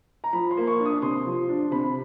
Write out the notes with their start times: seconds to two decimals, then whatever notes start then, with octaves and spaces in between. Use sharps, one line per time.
0.24 A#5
0.33 F3 B5
0.51 C6
0.57 A#3
0.67 C#6
0.80 D4
0.85 D#6
1.02 C3 C6
1.26 F3
1.49 D4
1.71 C3 B5